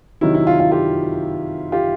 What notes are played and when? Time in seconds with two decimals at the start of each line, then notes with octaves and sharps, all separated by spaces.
0.21 C3 D#3 F#3 E4
0.34 E4
0.47 F4
0.60 F4
0.72 F4 G4
1.72 F4 G4